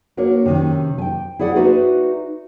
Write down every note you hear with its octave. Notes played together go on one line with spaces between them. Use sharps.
A#3 D4 F#4 A#4 C#5
C3 D#3 C#4
G5 G#5
E4 G#4 D5 F#5
D#4 F#4 B4 C5 D5 E5